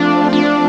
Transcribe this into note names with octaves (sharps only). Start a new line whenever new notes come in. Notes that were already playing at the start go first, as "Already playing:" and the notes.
Already playing: F3 A3 C4 D4 F4 D5
D4